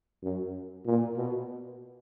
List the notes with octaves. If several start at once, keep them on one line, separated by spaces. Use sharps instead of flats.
F#2
A#2
B2